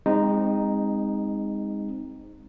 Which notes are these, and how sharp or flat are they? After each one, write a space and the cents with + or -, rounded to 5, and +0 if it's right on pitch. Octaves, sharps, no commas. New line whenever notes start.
G#3 -30 C4 +5 D#4 +0